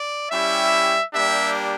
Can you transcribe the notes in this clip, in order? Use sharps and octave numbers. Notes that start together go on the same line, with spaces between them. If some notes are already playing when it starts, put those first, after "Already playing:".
Already playing: D5
G3 C#4 E4 G4 E5
G3 A#3 D4 G4 E5